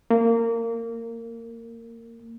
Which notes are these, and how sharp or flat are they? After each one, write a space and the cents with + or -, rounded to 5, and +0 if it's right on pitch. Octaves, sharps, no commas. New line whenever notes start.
A#3 -20